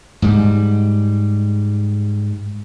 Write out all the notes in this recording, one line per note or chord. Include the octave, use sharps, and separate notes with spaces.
G#2 G3